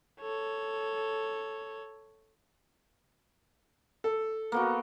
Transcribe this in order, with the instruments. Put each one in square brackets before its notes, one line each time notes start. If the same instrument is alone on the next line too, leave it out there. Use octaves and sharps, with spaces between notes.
[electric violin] A4 C#5
[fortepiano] A4
[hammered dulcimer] A#3 B3 F#4